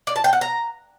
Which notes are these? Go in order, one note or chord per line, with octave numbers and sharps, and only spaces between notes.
D5
A5
G5
F#5
A#5